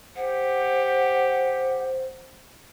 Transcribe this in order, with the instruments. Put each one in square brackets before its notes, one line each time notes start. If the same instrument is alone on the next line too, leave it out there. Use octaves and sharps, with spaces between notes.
[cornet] G4 [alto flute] C5 [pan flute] F#5